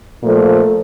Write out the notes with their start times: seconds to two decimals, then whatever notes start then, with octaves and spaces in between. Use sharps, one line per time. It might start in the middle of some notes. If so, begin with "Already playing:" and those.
0.22 A#2 F3 A3